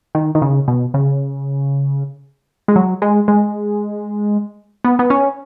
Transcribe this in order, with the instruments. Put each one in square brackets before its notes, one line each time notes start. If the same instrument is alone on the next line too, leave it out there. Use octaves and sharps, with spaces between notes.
[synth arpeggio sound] D#3
D#3
C#3
B2
C#3
G#3
F#3
G#3
G#3
B3
B3
C#4